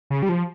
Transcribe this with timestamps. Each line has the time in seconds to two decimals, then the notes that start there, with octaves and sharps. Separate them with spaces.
0.10 C#3
0.23 G3
0.29 F3